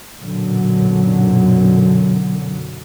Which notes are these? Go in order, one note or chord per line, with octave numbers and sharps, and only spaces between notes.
B1 F#2 A#2 D3 F#3